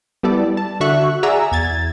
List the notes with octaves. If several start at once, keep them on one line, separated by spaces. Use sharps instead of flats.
G3 B3 E4 A4 D5
A5
D3 D4 F#4 E5 C#6 F#6
G#4 D5 E5 F#5 A#5 E6
E2 G#6 A6